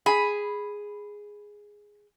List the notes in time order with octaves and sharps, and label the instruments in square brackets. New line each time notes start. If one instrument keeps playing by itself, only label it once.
[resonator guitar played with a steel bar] G#4 [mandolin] B5